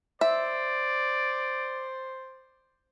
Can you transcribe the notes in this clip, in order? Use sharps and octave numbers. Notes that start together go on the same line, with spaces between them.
C5 D5 E5